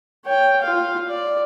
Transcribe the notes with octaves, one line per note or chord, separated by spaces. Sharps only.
C#5 G5
F4 F5
D5